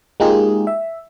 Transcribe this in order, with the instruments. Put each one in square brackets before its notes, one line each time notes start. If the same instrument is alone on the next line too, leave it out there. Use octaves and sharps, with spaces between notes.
[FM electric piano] G#3 A#3 D#4 F4 G4 G#4
E5